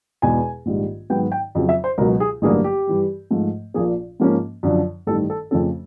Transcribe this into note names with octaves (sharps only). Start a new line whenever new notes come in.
E2 B2 G#3 G#5
A#1 G#2 D#3 G3
G#2 D#3 F#3 B3 G5
G5
F2 C#3 F#3
E5
C5
C#2 B2 F#3 A#4
G#4
A1 G2 D3 F#3 A#3 G#4
G4
G2 E3 G3
G#2 F3 A3
A#1 A#2 F3 A#3 G#4
G#2 F3 A#3 C#4
F#2 D3 F3
A1 G2 D#3 A4
A4
F2 C#3 F3 A3 C#4 A4